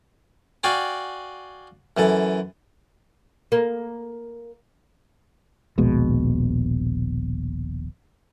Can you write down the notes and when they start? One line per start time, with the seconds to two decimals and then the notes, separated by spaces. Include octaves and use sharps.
0.64 F#4 D5 F5 G5 G#5
1.97 F#2 E3 A4
3.52 A#3
5.78 D#1 A#1 B2 G#3